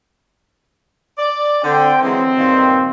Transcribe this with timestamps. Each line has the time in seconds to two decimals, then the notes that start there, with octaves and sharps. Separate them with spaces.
1.18 D5
1.63 D3 C4 G5
2.03 E3 F#3 G#3 C4
2.37 G2 A#2 D#3